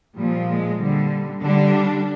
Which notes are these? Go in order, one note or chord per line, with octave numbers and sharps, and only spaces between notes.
A#2 F3 G3
G#3
D3 G3
D3 G3 D4